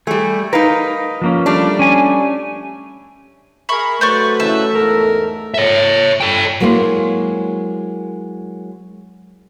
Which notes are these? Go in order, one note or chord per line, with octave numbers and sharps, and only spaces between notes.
G3 A3 G#4
D#4 A#4 B4 F5
F3 A#3 C#4
G3 A3 D4
C#4 G#5
G#4 A#4 E5 B5 C#6
F#3 A3 B4 C5 D5 C#6
C#3 E3 E5 A5
E2 G#2 A4 A#4
C#5 E5
A4 G5
F#3 G#3 A#3 E4 C5